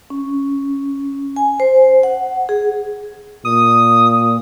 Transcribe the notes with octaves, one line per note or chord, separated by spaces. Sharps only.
C#4
G#5
C5
F#5
G#4
A#2 D#6